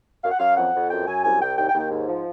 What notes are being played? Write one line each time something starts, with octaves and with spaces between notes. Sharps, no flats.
F#2 F5
F#5
F#2 F5
F2 F#5
F2
F#2 G5
F#2 G#5
C2 G#5
C2 G5
D#2 G5
G5
D#2
G5
G#2
F3